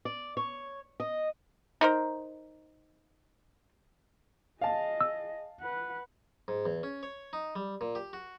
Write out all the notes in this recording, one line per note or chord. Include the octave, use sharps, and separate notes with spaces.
D5
C#5
D#5
D#4 A#4 C5
G#4 D#5 F5 A5
E6
B4 F#5
G#2
E2
C#4
C#5
D#4
G3
A#2
G4
F#4